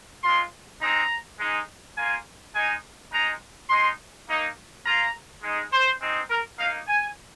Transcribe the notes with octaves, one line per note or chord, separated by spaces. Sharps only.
G#3 F4 C6
G#3 C4 D#4 A#5
G#3 D#4
A#3 F4 G#5
G#3 D#4 G#5
G#3 D#4 A#5
G#3 D#4 C6
A#3 D#4
A#3 F4 A#5
G#3 D#4
C5
G#3 C4 D#4
A#4
A#3 D#4 F5
G#5